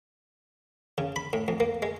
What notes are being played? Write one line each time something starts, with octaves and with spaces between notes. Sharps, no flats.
C#3
B5
A2
F2
A#3
G#3